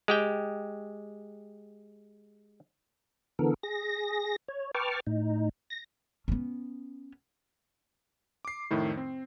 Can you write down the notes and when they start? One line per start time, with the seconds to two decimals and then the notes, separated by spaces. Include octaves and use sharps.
0.08 G#3 G4 G5
3.39 D3 E3 B3 A4 A#4
3.63 G#4 A#6
4.48 C#5
4.74 B4 G5 A5 C#6 D6 F6
5.07 A2 D#4
5.70 A#6
6.28 B3 C#4
8.45 D6 C7
8.71 F2 A2 D#3 E4
8.97 C4